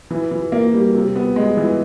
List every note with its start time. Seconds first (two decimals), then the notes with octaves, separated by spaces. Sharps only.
0.11 E3
0.31 E3
0.52 A#3
0.73 G3
0.94 C3
1.16 B3
1.36 G#3
1.57 E3